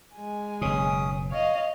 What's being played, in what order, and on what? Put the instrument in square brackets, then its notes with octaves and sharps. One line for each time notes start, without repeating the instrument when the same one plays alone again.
[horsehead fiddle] G#3 G#5
[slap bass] F#1 B2 [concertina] C#4 D#6
[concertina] C#5 [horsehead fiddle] D#5 F5